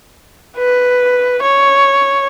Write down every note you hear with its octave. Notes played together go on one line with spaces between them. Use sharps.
B4
C#5